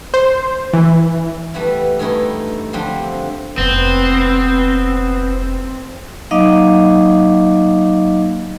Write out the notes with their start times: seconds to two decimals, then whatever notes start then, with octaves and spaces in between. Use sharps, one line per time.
0.14 C5
0.73 E3
1.54 E3 G3 A3 B3 E4
1.99 G2 A3 C#4 D#4 E4
2.73 D3 F3 G3 C4 D4 C5
3.58 F1 B3 C4
6.31 F#3 A#3 D#4 D#5 F5 D6